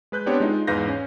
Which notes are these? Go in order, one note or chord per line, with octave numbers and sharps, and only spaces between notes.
G#3 B4 F#6 G6
B3 C4 D4 G4 B4 C#5
G#3 D#4 F4
E2 G#2 B4 F5 G6 A#6
C#4